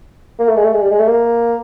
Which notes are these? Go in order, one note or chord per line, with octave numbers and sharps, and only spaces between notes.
A#3
A3
G#3
A3
G#3
G3
G#3
A3
A#3